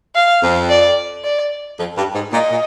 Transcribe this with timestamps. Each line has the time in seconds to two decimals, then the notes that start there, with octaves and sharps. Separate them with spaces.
0.15 F5
0.43 F2
0.70 D5
1.24 D5
1.79 F2
1.97 G2
2.15 G#2
2.33 A#2 D#5
2.51 A#2